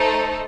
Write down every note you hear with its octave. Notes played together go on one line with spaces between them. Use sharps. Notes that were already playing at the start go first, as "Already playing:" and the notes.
Already playing: A3 D#4 A4 C5